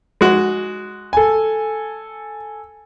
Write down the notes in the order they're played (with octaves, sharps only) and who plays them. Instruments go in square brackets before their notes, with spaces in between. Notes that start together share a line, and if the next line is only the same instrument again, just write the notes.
[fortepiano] G#3 F#4
[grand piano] A4 G#5